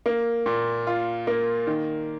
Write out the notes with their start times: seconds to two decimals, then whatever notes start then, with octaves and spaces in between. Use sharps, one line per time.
0.06 A#3
0.46 A#2
0.87 F4
1.27 A#3
1.67 D#3